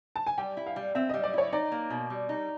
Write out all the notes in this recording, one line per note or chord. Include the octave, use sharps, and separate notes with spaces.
A5
G#5
G3 G5
E4
F5
G3
C4 E5
G3 D#5
D5
E4 C#5
D#4 D5
A#3
B2
G3
D#4